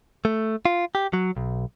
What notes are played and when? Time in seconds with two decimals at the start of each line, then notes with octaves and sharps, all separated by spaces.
0.25 A3
0.65 F4
0.95 G4
1.13 F#3
1.37 B1